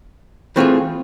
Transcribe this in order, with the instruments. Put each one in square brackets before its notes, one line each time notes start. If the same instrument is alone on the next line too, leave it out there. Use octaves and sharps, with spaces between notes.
[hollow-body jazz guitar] E3 A3 C4 F4 G#4